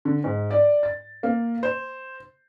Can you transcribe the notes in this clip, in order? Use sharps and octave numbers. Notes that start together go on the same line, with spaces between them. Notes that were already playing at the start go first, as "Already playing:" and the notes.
D3
G#2
D5
A6
A#3
C5